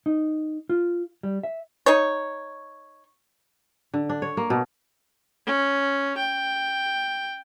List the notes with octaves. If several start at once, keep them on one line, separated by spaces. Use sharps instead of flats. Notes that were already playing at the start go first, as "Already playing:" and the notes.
D#4
F4
G3
E5
D#4 C#5
D3
D4
C#5
A#3
B2
C#4
G5